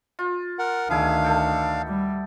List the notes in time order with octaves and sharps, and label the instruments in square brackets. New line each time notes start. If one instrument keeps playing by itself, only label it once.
[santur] F4
[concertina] A#4 F#5
[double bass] D2 D#3 [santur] B3 E4 G#4 [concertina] D4 F5
[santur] A4 G5
[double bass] G3